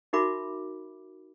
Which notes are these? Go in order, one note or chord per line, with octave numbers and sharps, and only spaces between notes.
D#4 F#4 A#4 E5 B5 D6